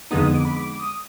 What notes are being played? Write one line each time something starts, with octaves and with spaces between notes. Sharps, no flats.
F2 D3 G#3 B3 D#4 D#6
D#6
D6
B5
D6
D#6